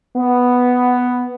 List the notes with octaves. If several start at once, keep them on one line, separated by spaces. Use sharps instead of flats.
B3